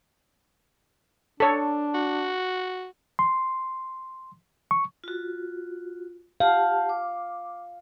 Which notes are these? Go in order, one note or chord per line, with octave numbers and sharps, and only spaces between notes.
D4 A4 C#5
F#4
C6
C#6
F4 F#4
G4 F5 F#5 A5
D6